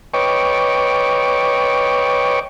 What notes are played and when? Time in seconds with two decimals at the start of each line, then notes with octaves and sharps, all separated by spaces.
0.14 B4 C#5 D#5 G5 C#6 D6